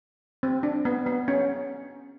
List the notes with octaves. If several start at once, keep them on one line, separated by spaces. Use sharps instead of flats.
C4
D4
B3
B3
C#4